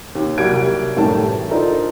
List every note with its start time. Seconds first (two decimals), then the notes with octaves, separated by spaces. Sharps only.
0.15 D#2
0.38 C2 F#3 G3 A#3 G#6 D7
0.96 F#2 A2 D#3 G3 A3 A5
1.26 E3
1.51 D4 D#4 F4 A4 A#4 C5